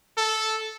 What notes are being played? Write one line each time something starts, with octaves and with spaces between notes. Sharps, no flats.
A4